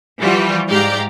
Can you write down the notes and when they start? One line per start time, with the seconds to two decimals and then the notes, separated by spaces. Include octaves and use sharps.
0.20 E3 F3 G3 F4 F#4
0.68 G#2 G4 D5 F5 A#5